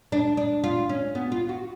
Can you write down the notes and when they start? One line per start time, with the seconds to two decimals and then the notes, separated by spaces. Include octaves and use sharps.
0.12 D4
0.37 D4
0.64 F4
0.89 C#4
1.15 B3
1.32 F4
1.49 F#4